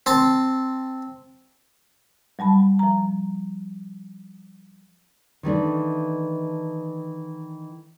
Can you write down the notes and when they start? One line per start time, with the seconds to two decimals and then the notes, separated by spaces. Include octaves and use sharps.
0.06 C4 A5
2.39 F#3 G3 A5 B5
2.79 F3 A#5
5.43 D#3 E3 A3 D4